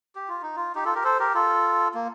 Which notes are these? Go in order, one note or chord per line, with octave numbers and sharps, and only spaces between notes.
G4
F4
D#4
F4
D#4 G4
F4 A4
G4 A#4
A4 C5
G4 A#4
F4 A4
A#3